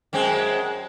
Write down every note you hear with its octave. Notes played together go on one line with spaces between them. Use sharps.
F#2 G#3 C4